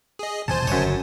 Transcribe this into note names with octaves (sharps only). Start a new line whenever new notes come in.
G#4 D#5
D#1 B2 F3 C5 G#5 A5
G1 F#2 C#3 C#5